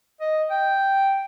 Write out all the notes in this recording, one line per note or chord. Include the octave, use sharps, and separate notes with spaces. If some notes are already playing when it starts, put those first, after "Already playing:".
D#5
G5